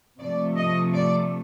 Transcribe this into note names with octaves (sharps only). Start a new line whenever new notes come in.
C3 F3 A3 D5
D#5
D5